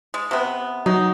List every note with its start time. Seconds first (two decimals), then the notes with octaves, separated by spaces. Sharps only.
0.14 G#3
0.31 C3 B3
0.86 F#3 D#4